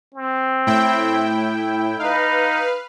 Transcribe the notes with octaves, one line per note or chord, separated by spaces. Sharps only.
C4
A2 E4 G5
D#4 B4 F5